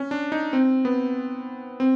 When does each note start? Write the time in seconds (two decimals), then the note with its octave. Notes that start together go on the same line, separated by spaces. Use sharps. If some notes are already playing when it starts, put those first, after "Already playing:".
Already playing: C#4
0.11 D4
0.32 D#4
0.53 C4
0.85 B3
1.80 C4